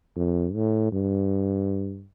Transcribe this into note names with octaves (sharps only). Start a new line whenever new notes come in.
F2
A2
G2